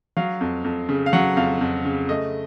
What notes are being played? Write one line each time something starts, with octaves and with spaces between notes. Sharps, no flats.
F#3 F5
F2
F2
C#3
F5
F#3 F#5
F2 F5
F2
C#3
A3 D#5